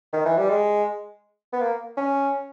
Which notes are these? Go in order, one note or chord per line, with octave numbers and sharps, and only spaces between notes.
D#3
E3
G3
G#3
B3
A#3
C#4